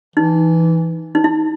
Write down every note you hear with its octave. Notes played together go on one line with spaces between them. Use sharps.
E3 D#4
D#4
E4